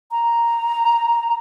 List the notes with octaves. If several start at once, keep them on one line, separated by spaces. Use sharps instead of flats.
A#5